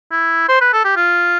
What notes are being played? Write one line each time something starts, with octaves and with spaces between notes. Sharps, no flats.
E4
C5
B4
A4
G4
F4